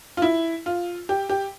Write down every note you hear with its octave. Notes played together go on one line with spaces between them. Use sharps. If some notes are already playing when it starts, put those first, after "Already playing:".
F4
E4
F4
G4
G4